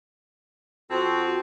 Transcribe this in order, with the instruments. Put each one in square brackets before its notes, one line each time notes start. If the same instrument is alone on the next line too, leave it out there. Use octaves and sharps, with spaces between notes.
[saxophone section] F2 C4 [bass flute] F#4